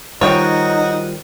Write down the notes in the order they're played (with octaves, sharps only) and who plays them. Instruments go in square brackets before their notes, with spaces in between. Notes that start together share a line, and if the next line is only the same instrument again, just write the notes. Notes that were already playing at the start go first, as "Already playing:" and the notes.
[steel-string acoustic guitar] D#3 F3 G3 [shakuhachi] D#4 [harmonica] F#4 D#5 [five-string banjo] C#5 G5